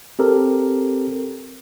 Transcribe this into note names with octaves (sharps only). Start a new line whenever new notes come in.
C4 G4 A4 A#4